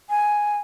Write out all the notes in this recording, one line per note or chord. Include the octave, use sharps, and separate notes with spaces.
G#5